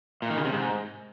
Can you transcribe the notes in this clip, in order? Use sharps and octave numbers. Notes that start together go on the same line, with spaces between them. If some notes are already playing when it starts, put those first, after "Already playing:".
A#2
D#3
C#3
C3
G#2